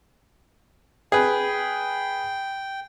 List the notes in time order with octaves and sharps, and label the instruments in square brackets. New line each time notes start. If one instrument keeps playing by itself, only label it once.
[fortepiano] G#4 B4 [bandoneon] G5